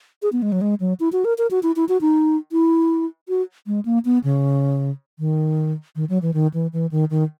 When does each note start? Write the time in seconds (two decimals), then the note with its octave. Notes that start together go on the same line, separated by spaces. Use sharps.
0.22 G#4
0.33 B3
0.42 G#3
0.52 F#3
0.61 G#3
0.80 F#3
1.00 E4
1.12 F#4
1.25 A#4
1.38 A#4
1.51 F#4
1.63 E4
1.76 E4
1.89 F#4
2.01 D#4
2.52 E4
3.29 F#4
3.67 G#3
3.85 A#3
4.05 B3
4.24 C#3
5.19 D#3
5.96 D#3
6.09 F#3
6.22 E3
6.34 D#3
6.54 E3
6.73 E3
6.91 D#3
7.10 D#3